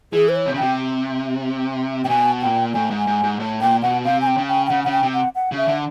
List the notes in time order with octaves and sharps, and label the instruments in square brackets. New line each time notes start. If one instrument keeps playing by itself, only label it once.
[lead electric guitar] E3 [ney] G#4
[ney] C5
C#5
[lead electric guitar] C3
C#3
[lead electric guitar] C3 [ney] G5
[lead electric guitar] C3 [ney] G5
[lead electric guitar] B2 [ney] G#5
[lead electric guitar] A#2 [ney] G5
[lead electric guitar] A2 [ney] G#5
[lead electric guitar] G#2
[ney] G#5
[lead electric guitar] G#2
G#2
A2
[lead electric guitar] A#2 [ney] G5
[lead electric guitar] B2 [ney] F#5
[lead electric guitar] C3 [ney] F5
[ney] G#5
G5
[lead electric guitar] C#3
[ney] G5
G5
[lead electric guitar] C#3 [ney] F#5
[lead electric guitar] C#3 [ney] F#5
[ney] G5
[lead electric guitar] C3
[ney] F#5
F#5
[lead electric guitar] C#3
[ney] E5
[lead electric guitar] D3